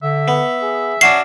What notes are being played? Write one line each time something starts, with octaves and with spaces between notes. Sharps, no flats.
D3 E5
B3
G#4
C#4 D4 F#4 E5 C7